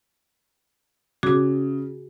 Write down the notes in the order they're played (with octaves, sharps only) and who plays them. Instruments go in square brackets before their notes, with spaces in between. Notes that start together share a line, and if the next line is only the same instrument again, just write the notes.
[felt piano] C#3 [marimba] F#4 G#4 D6